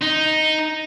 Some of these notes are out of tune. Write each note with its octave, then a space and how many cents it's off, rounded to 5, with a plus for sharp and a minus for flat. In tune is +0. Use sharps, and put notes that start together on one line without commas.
D#4 +0